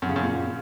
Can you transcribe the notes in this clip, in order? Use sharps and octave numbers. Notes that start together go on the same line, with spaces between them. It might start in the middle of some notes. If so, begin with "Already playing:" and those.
F#2
C#3
F#2
A#2